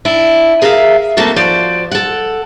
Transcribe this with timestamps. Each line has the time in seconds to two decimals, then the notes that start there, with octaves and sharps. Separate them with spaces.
0.05 D4 E4
0.62 G#4 A#4 D5 E5 F5
1.17 C3 A3 A#3 F#4 A4 A5
1.36 F3 F#4 C5 D5
1.91 A4 F#5